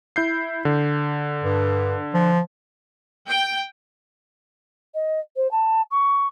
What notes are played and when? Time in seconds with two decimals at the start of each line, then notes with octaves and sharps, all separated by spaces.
0.16 E4 G6 C7
0.65 D3
1.44 G2
2.14 F3
3.28 G5
4.94 D#5
5.36 C5
5.51 A5
5.91 C#6